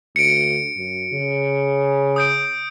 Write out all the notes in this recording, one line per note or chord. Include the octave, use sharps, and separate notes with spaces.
D2 C#7 D7
F#2
C#3
D#6 G6 D7